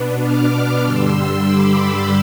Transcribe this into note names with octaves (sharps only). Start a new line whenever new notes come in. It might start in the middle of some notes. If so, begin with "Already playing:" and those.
Already playing: B2 B3 D4
D6 F6
G2 D3 G3 C6 E6
B5 D6